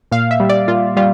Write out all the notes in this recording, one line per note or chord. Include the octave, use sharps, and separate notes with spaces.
A#2 F5
E5
G3
D5
A#2 F4
G3 F4